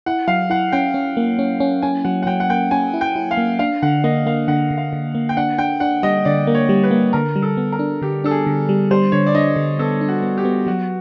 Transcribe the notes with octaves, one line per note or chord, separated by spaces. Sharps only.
E4 F#5
F#3 F5
E4 F#5
C#4 G5
C#4
A#3
C#4
C#4
C#4 G#5
F#3 F#5
F#5
F#3 G5
F#5
A#3 G5
C#4 G#5
E4
G5
E4
F5
A#3
D4 F5
D3 F#5
A#3 D#5
A#3 F5
D3 F#5
D3
F5
D3
A#3
G5
D4 F#5
D4 G5
D4 F#5
G3 D#5
D3 D5
A#3
C#5
G3
B4
A#3
D3 A#4
G3
A4
B3
A#4
D4
D3 G4
D4 A4
G#4
D3
G3
G3 C5
D3 C#5
D5
D4 D#5
D3
B3 A4
D4
F#4
B3
G4
B3
F#3 F#4